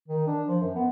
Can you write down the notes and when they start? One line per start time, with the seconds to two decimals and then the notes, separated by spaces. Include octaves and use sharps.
0.08 D#3
0.27 D4
0.48 F3
0.61 F#2
0.75 B3